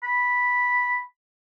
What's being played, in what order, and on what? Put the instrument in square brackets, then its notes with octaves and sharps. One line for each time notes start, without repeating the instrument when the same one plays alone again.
[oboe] B5